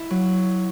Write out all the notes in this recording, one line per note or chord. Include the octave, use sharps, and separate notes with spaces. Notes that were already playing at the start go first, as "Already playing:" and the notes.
Already playing: E4
F#3